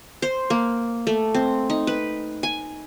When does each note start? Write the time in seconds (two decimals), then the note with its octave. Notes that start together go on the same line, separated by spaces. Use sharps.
0.22 C5
0.50 A#3
1.07 A3
1.34 C4
1.70 D#4
1.87 B4
2.43 G#5